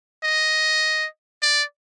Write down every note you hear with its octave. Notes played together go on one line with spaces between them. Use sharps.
D#5
D5